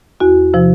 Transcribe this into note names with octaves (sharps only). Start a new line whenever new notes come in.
E2 F#4
C3 F3